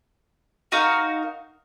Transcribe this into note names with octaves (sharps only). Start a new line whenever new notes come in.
D#4 F#4 A#4 F5